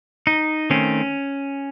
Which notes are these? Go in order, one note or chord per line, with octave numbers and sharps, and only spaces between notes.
D#4
D#3 A3 C4 C#4